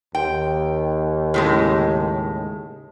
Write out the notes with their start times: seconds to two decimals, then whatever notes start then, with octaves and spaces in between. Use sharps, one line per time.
0.15 D#2 G5
1.34 A2 C#3 G#3